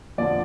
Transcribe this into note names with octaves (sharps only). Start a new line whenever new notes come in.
F2 D3 F3 D5